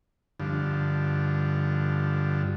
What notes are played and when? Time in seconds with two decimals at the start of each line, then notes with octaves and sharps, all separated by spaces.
0.40 G2 D3 F3